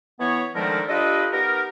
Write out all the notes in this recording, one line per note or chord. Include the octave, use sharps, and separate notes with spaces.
E3 B3 C#5
D3 D#3 F3 G#3 A3 A#4
D4 F4 G4 A4 B4 D#5
B3 D#4 G4 A#4